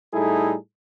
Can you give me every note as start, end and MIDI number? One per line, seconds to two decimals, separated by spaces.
0.14 0.56 45
0.14 0.56 55
0.14 0.56 63
0.14 0.56 64
0.14 0.56 68
0.14 0.56 69